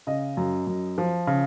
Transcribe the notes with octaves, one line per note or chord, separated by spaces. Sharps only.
C#3 D#5
F#2
F#2
F3
C#3